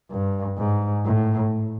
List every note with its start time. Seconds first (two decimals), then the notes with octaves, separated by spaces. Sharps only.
0.11 G2
0.58 G#2
1.05 A2